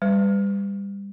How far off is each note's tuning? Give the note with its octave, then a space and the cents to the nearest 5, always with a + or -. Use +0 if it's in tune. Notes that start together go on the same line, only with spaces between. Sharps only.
G3 +25 B4 +30